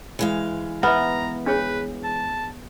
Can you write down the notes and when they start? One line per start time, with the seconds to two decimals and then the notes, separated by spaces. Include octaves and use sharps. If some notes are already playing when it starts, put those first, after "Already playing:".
0.19 E3 G#3 F5
0.83 B3 B4 E5 A#5
1.46 D4 G#4 B4 C#5
2.04 A5